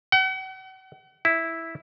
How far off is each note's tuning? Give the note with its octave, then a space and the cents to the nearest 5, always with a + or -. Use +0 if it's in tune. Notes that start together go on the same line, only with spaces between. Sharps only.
F#5 +40
E4 -5